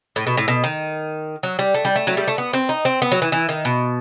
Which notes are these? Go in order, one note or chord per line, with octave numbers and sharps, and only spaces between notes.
A2
B2
A2
B2
D#3
F#3
G3
A3
G3
A3
F#3
G3
A3
B3
C4
D#4
C4
B3
F#3
E3
E3
D#3
B2